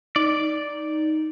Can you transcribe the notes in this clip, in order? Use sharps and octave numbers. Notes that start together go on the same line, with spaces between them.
D#4 D5